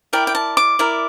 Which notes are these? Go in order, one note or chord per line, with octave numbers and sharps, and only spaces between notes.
E4 A#4 D5 G5
G5
A5
D6
E4 A#4 D5